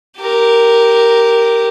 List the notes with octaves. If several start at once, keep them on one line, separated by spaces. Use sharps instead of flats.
G4 A#4